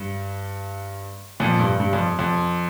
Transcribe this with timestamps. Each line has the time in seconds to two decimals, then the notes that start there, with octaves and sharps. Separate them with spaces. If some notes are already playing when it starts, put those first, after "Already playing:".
Already playing: G2
1.40 F2 A#2
1.60 G2
1.80 G2
1.93 F2
2.19 F2